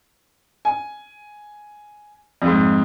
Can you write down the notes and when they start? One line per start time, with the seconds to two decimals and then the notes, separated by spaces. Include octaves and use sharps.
0.65 G#5
2.42 F2 G#2